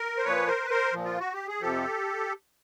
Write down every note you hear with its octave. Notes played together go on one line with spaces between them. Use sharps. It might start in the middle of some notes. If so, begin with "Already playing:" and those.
Already playing: A#4
C5
A#2 F3 B4 C#5
A#4 C5
B4
A#4 C5
A#2 F3
F4
F#4
G4
G#4
F2 C3 F3 G4 A4